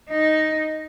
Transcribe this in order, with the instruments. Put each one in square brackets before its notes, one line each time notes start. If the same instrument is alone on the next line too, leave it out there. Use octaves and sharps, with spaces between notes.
[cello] D#4